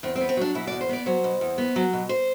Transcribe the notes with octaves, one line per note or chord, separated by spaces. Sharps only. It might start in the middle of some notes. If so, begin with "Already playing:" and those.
E2 C4
C4
B3
C4
F#3 D4
B2 E4
D5
E2
C5
B3 D5
F#3 C5
B2
E2
B3
F#3
B2
C5